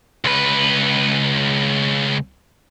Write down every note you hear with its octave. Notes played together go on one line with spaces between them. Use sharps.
C#2 B4